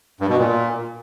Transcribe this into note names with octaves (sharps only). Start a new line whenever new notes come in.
G2
B2
A#2